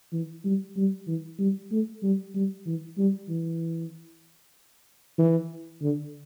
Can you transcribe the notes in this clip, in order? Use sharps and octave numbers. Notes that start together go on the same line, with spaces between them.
E3
G3
G3
E3
G3
A3
G3
G3
E3
G3
E3
E3
D3